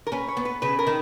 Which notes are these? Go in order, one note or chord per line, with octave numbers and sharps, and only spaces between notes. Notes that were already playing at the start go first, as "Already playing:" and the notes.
A#4
C#4 B4
C#5
B3
B4
C#3 B4
A#4
D#3